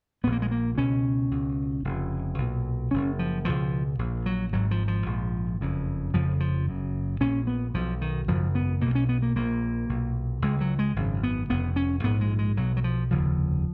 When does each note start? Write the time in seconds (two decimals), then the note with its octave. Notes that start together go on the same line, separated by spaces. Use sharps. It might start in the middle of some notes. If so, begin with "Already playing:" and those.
0.24 A#1 A#2 B3
0.32 A#3
0.42 G#3
0.51 A#3
0.78 C#2 B2 C#4
1.31 C#2 B2
1.84 F1 F2 C#3
2.38 B1 A#2
2.91 F#1 F#2 C#3 C#4
3.19 F3
3.45 C#2 B2 F3
3.99 A#1 A#2
4.26 F#3
4.53 G#1 G#2 F#3
4.71 F3
4.88 F3
5.06 A#1 G#2
5.60 F#1 F2 C#3
6.13 F1 F2 C#3 F3
6.40 F3
6.67 F#1 F#2 C#3
7.20 A#1 A#2 C#4
7.47 B3
7.74 B1 B2 F3
8.01 D#3
8.28 G#1 F#2 C#3 F3
8.55 B3
8.81 B1 B2 A#3
8.95 C#4
9.09 B3
9.22 A#3
9.35 A#1 A#2 A#3
9.89 B1 A#2
10.42 C#2 C#3 G#3
10.61 F#3
10.79 G#3
10.96 G#1 F#2 C#3
11.23 B3
11.49 F1 F2 C#3 B3
11.76 C#4
12.03 A#1 G#2 B3
12.21 G#3
12.39 G#3
12.57 B1 B2 F#3
12.77 F#3
12.84 F3
13.10 F1 D#2 C#3 F3